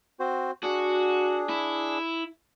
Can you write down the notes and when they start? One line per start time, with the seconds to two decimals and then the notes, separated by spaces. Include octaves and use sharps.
0.20 C4 F#4 C5
0.63 D4 F#4 G#4
1.50 E4